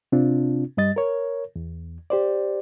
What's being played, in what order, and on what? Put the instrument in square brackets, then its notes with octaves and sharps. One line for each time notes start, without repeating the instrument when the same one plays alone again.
[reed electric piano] C3 C4 D4 F4
G2 G3 D#5 A6
A#4 C#5
E2
G4 C5 D5